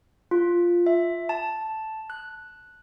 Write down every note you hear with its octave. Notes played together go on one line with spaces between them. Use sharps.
F4
E5
A5
F#6